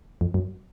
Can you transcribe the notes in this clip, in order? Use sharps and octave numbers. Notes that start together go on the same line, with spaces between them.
F2
F#2